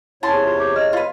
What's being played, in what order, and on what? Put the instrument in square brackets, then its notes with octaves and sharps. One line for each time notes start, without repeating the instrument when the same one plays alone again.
[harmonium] E2 C3 C#5 [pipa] C#4 A5 C6 [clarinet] E4
[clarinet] G#4
F4
G4
[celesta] D#5 [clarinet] F6
[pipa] F4 B4